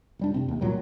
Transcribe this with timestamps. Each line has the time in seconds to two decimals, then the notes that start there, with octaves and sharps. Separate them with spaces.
0.19 F1 G3 D4
0.34 G2 C3 C4
0.49 D#2
0.61 C#2 A#2 F#3 G3